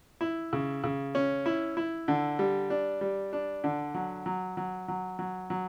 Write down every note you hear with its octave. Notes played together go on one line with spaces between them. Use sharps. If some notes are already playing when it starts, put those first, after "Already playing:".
E4
C#3
C#3
C#4
E4
E4
D3
G3
D4
G3
D4
D3
F#3
F#3
F#3
F#3
F#3
F#3